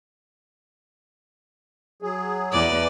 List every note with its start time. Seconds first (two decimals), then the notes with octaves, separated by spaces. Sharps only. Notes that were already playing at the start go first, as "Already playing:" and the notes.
2.02 F#3 G#4
2.52 E2 B4 D5